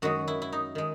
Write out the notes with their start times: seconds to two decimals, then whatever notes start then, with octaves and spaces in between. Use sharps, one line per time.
0.02 F#2 D#3 G#3 F#4
0.28 E4
0.42 E4
0.53 D#4
0.75 D#3 G#3